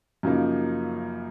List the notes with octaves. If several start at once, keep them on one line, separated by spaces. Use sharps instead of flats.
F#2 C#3 F3 A#3 D#4